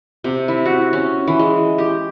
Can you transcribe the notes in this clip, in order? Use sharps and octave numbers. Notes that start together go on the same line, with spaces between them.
C3
E4
F#4
C#4
E3
G#3
G4